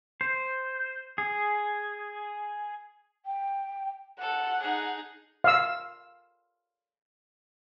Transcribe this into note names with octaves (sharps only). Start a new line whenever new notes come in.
C5
G#4
G5
A4 F#5
D#4 G#4
F5 E6